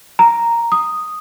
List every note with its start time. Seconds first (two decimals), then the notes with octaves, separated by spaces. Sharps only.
0.19 A#5
0.72 D#6